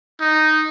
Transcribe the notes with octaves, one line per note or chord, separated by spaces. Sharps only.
D#4